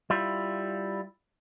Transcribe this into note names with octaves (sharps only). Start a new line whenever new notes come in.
G3 E4 F4